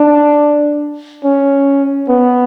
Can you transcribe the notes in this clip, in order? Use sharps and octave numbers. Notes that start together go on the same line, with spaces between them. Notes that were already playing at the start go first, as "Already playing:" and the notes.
Already playing: D4
C#4
B3